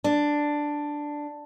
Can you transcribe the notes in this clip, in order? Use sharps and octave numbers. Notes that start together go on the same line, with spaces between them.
D4